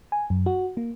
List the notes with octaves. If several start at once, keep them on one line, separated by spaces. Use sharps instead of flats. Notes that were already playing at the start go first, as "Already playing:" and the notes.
G#5
F#2
F#4
A#3